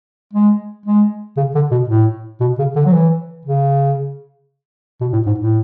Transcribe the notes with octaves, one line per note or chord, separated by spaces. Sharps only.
G#3
G#3
C#3
D3
B2
A2
B2
C#3
D3
F#3
E3
C#3
B2
A2
G#2
A2